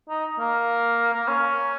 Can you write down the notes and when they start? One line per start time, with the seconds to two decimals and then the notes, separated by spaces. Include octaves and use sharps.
0.09 D#4
0.39 A#3
1.14 A#3
1.28 C#4